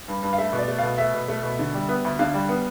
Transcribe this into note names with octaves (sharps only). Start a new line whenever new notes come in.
G2
G2
F5
A3 E5
B2
D5
A3
B2 F5
A3 E5
B2
A3
B2
D3
G3
B3
D2
D3 F5
G3
B3